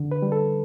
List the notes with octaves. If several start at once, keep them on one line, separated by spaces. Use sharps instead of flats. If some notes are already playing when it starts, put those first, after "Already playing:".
Already playing: D3
B4
G3
A4